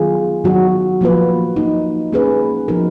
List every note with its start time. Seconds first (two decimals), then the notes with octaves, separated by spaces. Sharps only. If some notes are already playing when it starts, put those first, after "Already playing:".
Already playing: D#3 F#3 B3 F4 G#4
0.44 D#3 F#3 B3 D#4 F#4
1.01 F3 A#3 F4 B4
1.56 F3 A#3 D#4
2.13 A#3 C#4 G#4 B4
2.68 F3 B3 D#4 F#4 A#4